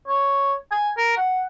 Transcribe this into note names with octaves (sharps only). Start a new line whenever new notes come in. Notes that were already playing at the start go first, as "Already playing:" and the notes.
C#5
G#5
A#4
F#5